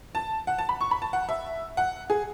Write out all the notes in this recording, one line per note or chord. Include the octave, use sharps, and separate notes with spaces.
A5
F#5
A5
B5
C#6
B5
A5
F#5
E5
F#5
G#4